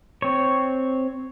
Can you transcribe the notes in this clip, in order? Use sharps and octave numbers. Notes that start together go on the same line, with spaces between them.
C4 C#5